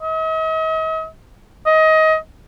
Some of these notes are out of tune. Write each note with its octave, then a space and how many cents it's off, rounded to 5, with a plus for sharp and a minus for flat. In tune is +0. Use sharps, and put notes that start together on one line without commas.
D#5 +45
D#5 +20